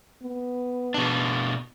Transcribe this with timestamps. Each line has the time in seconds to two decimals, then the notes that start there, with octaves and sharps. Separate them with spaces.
0.23 B3
0.94 B2 D4